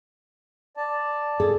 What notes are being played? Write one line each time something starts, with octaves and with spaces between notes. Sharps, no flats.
D5 A5
G#4 A4